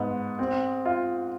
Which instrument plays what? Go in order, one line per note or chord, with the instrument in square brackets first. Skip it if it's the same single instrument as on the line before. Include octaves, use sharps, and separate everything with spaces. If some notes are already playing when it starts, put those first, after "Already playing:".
Already playing: [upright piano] G#2 B3
C4
F4